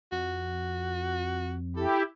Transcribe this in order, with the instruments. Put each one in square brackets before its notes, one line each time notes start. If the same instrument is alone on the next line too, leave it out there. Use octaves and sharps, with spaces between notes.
[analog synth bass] F2 [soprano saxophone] F#4
[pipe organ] E4 G4 [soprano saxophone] A4